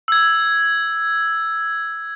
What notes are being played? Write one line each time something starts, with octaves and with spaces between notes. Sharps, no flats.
E6 G#6